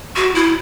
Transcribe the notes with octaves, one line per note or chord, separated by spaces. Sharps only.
F#4
E4